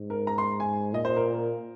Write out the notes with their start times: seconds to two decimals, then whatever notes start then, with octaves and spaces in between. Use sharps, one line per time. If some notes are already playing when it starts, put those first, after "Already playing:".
Already playing: G#2
0.10 A#4
0.27 A#5
0.38 C6
0.60 G#5
0.93 A#2 D#5
1.05 C5
1.16 A#4